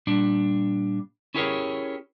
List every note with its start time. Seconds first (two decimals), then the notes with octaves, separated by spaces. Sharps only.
0.07 A#2 G3 D4
1.34 C#4 E4 G4 G#4 A#4 C#5